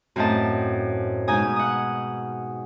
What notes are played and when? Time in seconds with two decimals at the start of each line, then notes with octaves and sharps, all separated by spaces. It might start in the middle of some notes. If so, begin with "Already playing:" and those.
0.16 F#2 A2 C4 C5 D#5 A5
1.28 G#2 B2 D#4 G#5 D#6
1.56 F#5 D#6